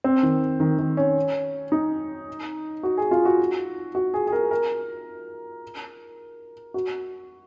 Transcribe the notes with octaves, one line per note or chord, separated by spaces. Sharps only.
C4
D#3
D#3
D#3
C#4
D#4
F#4
G#4
F4
F#4
F#4
G#4
G#4
A#4
A#4
F#4